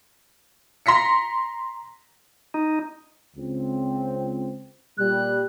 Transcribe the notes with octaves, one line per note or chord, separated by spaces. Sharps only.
A#5 C6 A#6 B6 C#7
D#4
C#2 C4
A#2 G3 F#6